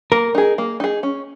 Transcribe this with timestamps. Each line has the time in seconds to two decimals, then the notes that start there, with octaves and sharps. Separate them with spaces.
0.12 A#3 A#4
0.35 D#4 G#4
0.58 A#3
0.80 D#4 G#4
1.03 C#4